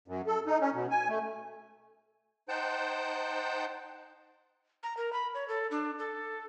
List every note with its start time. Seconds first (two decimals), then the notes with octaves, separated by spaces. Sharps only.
0.08 F#2
0.27 A4
0.47 D#4
0.61 C#4
0.74 B2
0.91 G#5
1.09 A3
2.49 D#4 C5 F#5 G5 A5 G6
4.83 A#5
4.97 A#4
5.13 B5
5.34 C#5
5.48 A4
5.71 D4
5.99 A4